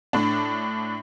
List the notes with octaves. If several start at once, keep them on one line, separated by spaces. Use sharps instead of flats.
A2 D4